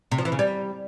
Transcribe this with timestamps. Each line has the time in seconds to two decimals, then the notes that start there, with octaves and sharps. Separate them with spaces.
0.11 C3
0.18 F3
0.25 E3
0.32 C#3
0.39 G3